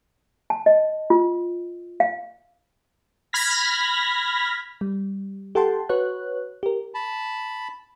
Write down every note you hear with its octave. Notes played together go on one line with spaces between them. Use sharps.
A5
D#5
F4
F5
B5 F6 G#6 A#6 B6
G3
G4 A4 F#5 G5 A5 C6
F#4 B4 C#5 F#6
G4 A#4
A5 B5